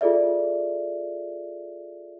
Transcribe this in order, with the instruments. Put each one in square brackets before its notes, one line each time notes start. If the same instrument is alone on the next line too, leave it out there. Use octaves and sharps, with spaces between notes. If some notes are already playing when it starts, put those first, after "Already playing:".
[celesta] F4 G#4 A4 D5 E5